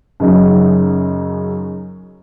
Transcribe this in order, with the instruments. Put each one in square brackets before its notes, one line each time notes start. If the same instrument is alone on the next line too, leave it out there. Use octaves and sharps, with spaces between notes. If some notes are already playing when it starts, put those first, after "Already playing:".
[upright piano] F#2 C#3 F#3 D#4